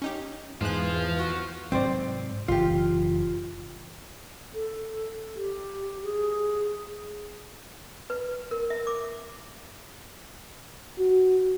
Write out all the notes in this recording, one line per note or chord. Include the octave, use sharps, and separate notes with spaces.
C#4 D#4 G4
E2 G#2 E3 F4 G#4 C5 F#6
F#4
G#2 C3 F#3 C4 C5 D5
F#1 A2 E3 F4 G4
A4
G4
G#4
B4
A#4
E5
D6
F#4